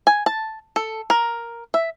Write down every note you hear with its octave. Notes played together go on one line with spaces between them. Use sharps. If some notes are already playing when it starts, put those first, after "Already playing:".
G#5
A5
A4
A#4
E5